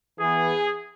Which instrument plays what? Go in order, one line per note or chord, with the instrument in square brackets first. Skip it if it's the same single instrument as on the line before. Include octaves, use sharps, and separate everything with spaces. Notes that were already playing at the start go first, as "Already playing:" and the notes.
[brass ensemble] E3 B3 G#4